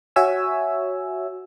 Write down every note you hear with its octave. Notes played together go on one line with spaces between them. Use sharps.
F#4 C#5 E5 G#5 E6